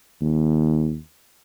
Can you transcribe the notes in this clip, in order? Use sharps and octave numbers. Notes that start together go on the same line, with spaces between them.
D#2